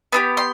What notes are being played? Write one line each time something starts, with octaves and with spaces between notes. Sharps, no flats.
B3 D4 G4
C6